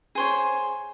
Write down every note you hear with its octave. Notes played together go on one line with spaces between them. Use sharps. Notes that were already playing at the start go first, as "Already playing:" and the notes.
G#4 C5 C#5